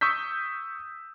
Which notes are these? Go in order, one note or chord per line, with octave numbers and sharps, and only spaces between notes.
C#6 D#6 E6 G6 B6